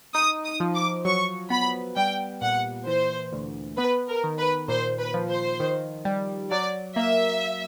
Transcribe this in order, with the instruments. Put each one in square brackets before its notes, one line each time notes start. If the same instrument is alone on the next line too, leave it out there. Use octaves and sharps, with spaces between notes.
[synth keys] D#4 [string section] D#6
[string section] D#6
[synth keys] F3
[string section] D6
[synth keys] F#3 [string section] C#6
[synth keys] B3 [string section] B5
[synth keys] G3 [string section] G5
[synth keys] A#2 [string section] F#5
[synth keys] E3 [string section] C5
[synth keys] D2
[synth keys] B3 [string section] B4
[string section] A#4
[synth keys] D#3
[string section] B4
[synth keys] A#2 [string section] C5
[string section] B4
[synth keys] F3
[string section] C5
[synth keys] D#3
G3
[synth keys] F#3 [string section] D5
[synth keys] A#3 [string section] E5